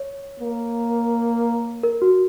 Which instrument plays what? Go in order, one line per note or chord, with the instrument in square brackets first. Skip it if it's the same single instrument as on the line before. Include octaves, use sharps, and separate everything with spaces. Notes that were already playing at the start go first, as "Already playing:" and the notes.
Already playing: [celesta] C#5
[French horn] A#3
[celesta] A#4
F#4